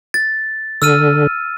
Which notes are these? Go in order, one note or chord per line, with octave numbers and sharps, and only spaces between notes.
A6
D3 E6 F6 D#7